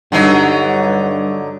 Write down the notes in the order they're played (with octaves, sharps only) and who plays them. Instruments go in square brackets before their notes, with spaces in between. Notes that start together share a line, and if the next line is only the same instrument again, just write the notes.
[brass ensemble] G2 [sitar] D3 F#3 D#4